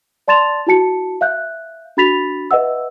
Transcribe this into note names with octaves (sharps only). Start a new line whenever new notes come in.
D5 A5 C6 A6 E7 F7
E4 F#4 A5 C#7
E5 F5 F#6 G6
D4 F#4 B5 A6 B6 F7
B4 D#5 E5 F#5 E6